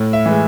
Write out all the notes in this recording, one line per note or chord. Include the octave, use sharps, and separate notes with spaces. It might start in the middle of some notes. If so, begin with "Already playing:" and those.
Already playing: A2
E5
E3 G#3